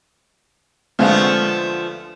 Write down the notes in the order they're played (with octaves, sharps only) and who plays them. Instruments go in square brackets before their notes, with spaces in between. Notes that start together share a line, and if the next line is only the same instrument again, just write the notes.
[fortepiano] D2 D3 G#3 [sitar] F3 A3 B3